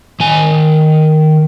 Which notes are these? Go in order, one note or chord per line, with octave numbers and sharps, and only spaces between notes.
D#3 G#5